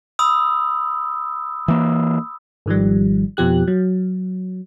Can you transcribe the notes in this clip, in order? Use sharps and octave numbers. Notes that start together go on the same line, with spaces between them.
B5 D#6 E6
E3 A#3
G#1 D#3 F3 G3
F2 B2 F3 G4 F#6
F#3